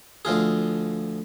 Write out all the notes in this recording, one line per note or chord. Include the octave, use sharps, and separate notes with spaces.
D2 F3 F4 G#4